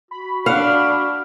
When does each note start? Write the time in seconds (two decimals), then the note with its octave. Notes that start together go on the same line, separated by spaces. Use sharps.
0.11 F#4 B5
0.46 D4 F5 F#5